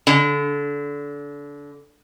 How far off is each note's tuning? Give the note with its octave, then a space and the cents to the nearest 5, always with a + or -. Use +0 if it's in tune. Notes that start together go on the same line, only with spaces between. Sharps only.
D3 -25